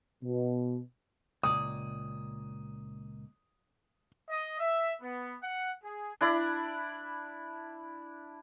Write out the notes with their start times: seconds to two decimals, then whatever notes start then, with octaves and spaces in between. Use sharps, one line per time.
0.23 B2
1.44 C#2 A#2 D5 D#6
4.29 D#5
4.58 E5
5.01 B3
5.41 F#5
5.82 G#4
6.21 D4 E4 D5 B5